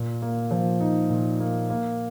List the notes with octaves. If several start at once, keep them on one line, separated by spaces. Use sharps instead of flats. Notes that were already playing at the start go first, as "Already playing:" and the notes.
Already playing: A#2
A#3
F3
D#4
A#2
A#3
A#3